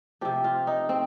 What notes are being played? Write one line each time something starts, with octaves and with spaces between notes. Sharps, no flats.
C3 F3 G4
F4
D#4
C4